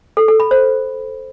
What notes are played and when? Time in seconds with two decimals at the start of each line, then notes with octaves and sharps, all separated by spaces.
0.17 A4
0.28 A4
0.40 B5
0.51 C5